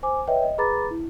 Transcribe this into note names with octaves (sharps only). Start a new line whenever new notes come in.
C5 G#5 D6
B4 C#5 D#5 E5 G5
D#5
G#4 B4 A#5 B5 D6 A6
E4